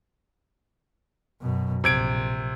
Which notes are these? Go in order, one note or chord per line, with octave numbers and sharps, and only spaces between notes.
F#2 B2
A#1 C3 G#6 D7